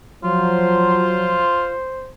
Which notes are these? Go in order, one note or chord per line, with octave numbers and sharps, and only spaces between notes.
F3 F#3 F4 C5